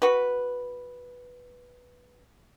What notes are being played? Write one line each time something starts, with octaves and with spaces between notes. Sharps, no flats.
F#4 B4